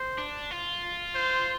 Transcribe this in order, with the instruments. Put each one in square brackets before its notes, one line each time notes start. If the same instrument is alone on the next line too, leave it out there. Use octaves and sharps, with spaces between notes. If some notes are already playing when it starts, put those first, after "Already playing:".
Already playing: [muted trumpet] C5
[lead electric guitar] D4
F4
[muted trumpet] C5